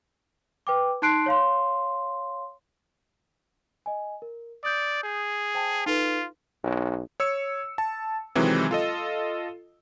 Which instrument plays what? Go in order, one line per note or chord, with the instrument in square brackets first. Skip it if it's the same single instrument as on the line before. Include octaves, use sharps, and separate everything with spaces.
[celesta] B4 G5 D6
D#4 A5 C6 F#6 C7 D7
C#5 F5 C6
D#5 G#5
A#4
[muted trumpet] D5 [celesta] D#6 G6
[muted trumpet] G#4
[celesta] C5 G5 A5
[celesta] D#4 A4 B4 [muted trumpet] F4
[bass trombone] B1
[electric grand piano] C#5 E6 C#7
A5
C3 D#3 E3 F#3 G#3 C4
F4 A4 D#5